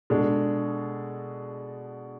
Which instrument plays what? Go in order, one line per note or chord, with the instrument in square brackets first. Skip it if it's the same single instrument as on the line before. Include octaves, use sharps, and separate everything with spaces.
[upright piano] B2 G#3 D4 A4